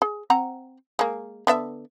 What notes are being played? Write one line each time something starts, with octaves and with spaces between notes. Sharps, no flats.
G#4
C4 F#5 A#5
G#3 A#3
D3 B3 E5